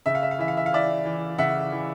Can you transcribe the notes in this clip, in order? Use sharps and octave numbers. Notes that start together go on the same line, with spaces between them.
C#3 E5
F5
E5
F5
E3 E5
F5
E5
F5
E3 D5 E5
E3
C#3 E5 F#5
E3